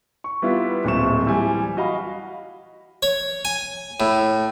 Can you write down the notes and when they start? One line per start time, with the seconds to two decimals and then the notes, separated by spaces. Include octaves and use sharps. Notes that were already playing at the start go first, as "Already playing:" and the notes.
0.24 C#6
0.42 G3 B3 E4 F4 B4
0.85 D1 A#2 A3 C4 C#6 E7
1.25 E3 G3 G#5
1.77 F#4 D#5 F5 B5
3.03 C#5
3.45 G#5
4.00 A2